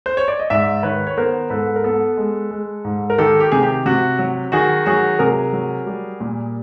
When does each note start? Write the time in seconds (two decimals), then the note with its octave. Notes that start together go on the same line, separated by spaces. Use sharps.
0.06 C5
0.17 C#5
0.28 D5
0.39 D#5
0.50 G#2 D5 E5
0.83 D#3 B4 C#5
1.07 C#5
1.17 B3 A#4 C5
1.50 G#2 A4 B4
1.76 A#4
1.84 B3 A4 B4
2.17 G#3
2.51 G#3
2.84 G#2
3.10 A#4
3.18 D#3 G4 A4
3.40 G4
3.52 C3 G#4
3.63 G4
3.86 C3 F#4
4.19 F#3
4.52 D#3 F#4 G#4
4.86 F#3 F#4 G#4
5.19 C3 G#4 A#4
5.53 F#3
5.86 G3
6.20 A#2